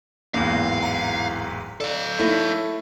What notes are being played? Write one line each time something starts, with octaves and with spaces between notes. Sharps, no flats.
D1 G#1 E2 A#3 F5
A#5 B6
A4 D5 F5
A3 A#3 D#4 E4 C#5